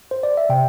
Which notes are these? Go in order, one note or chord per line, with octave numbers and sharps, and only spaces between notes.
C5
D5
E5
C3 G5